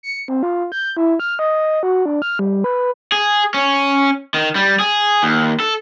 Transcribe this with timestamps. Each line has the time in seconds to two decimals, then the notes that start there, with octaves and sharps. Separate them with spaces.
0.03 C#7
0.28 C4
0.43 F4
0.72 G6
0.97 E4
1.20 F6
1.39 D#5
1.83 F#4
2.06 D4
2.22 F6
2.39 G3
2.64 B4
3.12 G#4
3.54 C#4
4.34 D#3
4.55 G3
4.80 G#4
5.23 D#2
5.60 A4